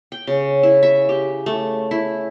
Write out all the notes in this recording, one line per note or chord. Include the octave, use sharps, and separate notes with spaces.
G5
C#3
E4
E5
G4
A3
E4